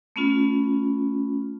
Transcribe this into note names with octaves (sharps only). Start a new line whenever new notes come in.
A3 B3 C#4 F4